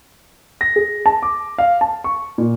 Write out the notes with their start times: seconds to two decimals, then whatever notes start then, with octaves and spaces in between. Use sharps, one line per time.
0.61 A#6
0.76 G#4
1.06 A5
1.23 D6
1.58 F5
1.81 A5
2.04 C#6
2.38 A#2